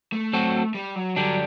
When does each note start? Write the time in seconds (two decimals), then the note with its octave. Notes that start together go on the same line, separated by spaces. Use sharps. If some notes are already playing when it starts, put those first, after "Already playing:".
0.13 A3
0.33 F#3 C4 F#4 A4
0.74 G3
0.95 F#3
1.16 D3 F#3 G3 D4